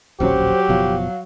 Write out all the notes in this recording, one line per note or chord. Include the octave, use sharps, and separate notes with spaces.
D1 A#1 F#3 C#4 G4 C5
F#1 B2 F3 F5